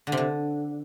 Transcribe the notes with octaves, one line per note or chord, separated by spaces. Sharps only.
D3
C3
D3